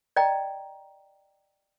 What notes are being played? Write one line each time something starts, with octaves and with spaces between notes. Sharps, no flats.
D5 D#5 G5 A#5